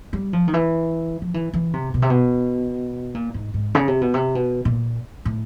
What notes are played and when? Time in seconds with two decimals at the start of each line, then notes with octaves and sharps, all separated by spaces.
0.13 G3
0.33 F3
0.48 D#3
0.53 E3
1.22 F3
1.34 E3
1.54 E3
1.73 C3
1.94 B2
2.02 C3
2.10 B2
3.14 A#2
3.34 G#2
3.54 G#2
3.75 C#3
3.88 C3
4.01 B2
4.14 C3
4.35 B2
4.65 A#2
5.25 A2